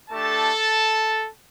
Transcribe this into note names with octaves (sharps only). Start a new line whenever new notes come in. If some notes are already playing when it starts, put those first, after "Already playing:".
A3 D4 G4 A4 A5